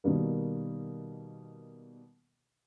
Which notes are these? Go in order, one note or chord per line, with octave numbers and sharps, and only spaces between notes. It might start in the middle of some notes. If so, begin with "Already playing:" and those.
B2 D#3 G3 A#3